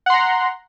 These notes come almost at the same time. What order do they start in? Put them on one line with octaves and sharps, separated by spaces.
F#5 C6 A#5